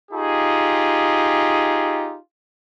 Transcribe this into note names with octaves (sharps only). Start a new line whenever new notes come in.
D#4 F4 G4 G#4